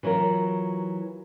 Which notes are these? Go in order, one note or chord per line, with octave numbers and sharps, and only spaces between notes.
E3 F#3 F4 A#4